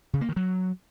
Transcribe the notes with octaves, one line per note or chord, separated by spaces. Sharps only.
C#3
A#3
D#3
F#3